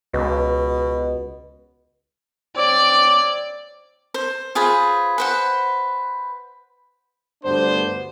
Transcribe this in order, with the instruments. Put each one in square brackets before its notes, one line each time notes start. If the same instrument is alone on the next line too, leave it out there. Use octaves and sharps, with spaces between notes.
[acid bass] C#2 [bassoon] B2
[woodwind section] C4 C#5 D6 [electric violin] D5
[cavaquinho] C5
F4 G#4 B4 C5
B4 C5 F#5
[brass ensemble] D2 G2 B3 D4 A4 C5